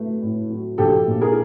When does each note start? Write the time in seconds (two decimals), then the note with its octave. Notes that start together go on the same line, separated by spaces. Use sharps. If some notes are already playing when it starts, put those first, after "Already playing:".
Already playing: F#3 A3 B4
0.22 A2
0.50 F#3
0.78 A#1 G4 A4
1.07 A#2
1.21 G#4 A#4